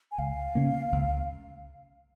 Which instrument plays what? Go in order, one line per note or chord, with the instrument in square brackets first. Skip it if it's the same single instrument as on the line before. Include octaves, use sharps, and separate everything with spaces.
[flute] G#5
[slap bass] C#2 [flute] F5
[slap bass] C#3 A#3 C#4
C#2